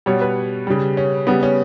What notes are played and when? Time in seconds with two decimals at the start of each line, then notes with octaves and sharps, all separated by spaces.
0.06 B2 G3 C#5
0.21 B4
0.67 C#3 G3
0.97 C#4
1.27 C#3 G3 B3
1.43 C#4